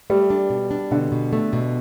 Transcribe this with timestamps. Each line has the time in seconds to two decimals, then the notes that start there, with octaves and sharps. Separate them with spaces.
0.10 G3 A3
0.30 D4
0.50 B2
0.71 D4
0.91 B2 D3
1.12 B2
1.33 A3
1.53 B2